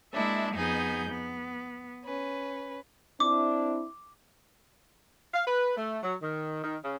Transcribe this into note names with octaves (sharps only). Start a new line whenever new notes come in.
G#3 A#3 D4 E4 E5
F2 B3 D#4 G#4 G6
B3
C#4 B4
C4 D4 E4 D6
F5
B4
A3
F#3
D#3
D#3
C#3